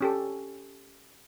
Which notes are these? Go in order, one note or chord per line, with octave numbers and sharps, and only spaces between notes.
C#4 G4 A4